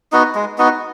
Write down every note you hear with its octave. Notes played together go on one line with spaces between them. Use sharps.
B3 D#4 F#4
G#3
B3 D#4 F#4